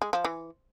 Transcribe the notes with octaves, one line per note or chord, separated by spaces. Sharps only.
G#3
F3
E3